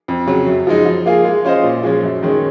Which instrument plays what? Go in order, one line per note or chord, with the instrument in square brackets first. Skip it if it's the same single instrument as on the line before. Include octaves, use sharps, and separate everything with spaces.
[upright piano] F2
C#3 F#3
F#2
F3 G#3 D#4
F3
A#3 F4 G#4
G#3
C#4 F4 C5 D#5
A#2
F3 G#3 C#4
F#2
D#3 G#3 C#4